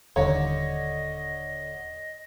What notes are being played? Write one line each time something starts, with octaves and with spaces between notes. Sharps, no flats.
D#1 D#2 D3 C#5 D#5